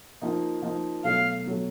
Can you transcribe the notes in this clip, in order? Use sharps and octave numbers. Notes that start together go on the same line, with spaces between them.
F3 A#3 D#4
F3 A#3 D#4
B2 F#3 A3 F5
B2 F#3 A3